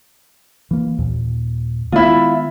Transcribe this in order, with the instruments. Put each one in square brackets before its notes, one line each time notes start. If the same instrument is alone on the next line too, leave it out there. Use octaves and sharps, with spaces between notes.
[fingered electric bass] E3 A#3
D#2 A#2
[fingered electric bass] D#3 G#3 B3 [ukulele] E4 F4